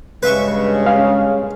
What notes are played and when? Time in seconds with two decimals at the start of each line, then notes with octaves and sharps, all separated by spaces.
0.23 G2 C#3 G#3 B4 E5 C#6
0.86 C#4 G#4 F5